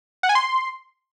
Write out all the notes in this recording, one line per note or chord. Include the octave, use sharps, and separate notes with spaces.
F#5
G#5
C6